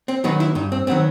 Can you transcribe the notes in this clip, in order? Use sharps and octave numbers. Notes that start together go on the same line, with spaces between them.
C4
D#3 F#3 B3 D#4
E4
G2 D#4
C4
D#3 F#3 B3 C4